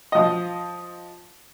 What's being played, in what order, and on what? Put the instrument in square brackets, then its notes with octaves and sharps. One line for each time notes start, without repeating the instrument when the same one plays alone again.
[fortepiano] F3 D#5